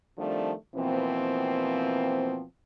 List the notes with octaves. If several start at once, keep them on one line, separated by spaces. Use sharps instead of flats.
D#3 F3 G3 A3 C4 D4
B2 E3 F3 A#3 C4